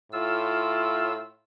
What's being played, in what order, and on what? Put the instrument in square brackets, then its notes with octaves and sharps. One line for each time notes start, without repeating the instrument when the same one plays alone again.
[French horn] A2 [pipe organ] F4 E6